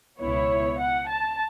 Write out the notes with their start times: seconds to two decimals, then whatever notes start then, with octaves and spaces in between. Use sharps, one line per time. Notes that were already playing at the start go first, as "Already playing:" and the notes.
0.20 C#2 B2 B3 E4 C#5
0.79 F#5
1.08 A5